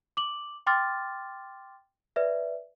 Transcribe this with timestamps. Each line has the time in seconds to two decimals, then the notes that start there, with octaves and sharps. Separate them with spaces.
0.17 D6 F#7
0.67 G5 C6 D6 F6 A6
2.16 B4 D5 E5